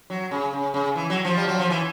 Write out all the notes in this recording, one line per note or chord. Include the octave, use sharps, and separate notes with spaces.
F#3
C#3
C#3
C#3
E3
F#3
F3
G3
F#3
F3
E3